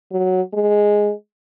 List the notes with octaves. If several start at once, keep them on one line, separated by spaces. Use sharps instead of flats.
F#3
G#3